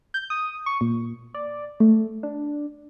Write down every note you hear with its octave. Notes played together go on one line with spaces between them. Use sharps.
G6
D#6
C#6
A#2
D5
A3
D4